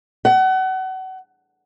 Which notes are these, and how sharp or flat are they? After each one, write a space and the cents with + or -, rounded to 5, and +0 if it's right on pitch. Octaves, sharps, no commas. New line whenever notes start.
F#5 +30